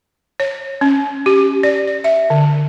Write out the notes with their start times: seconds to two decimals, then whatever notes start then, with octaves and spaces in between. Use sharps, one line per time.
0.40 C#5
0.81 C#4
1.26 G4
1.63 D5
1.87 D5
2.04 E5
2.30 D3